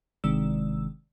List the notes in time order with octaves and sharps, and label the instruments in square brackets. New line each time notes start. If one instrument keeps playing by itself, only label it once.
[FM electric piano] G1 C3 D#3 G#3 D5 E6